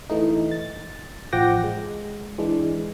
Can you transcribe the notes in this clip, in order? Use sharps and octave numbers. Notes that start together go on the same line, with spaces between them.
E3 A3 D#4
A6
A1 F3 F#5 G5 D6 A#6
G#3
E3 G#3 D4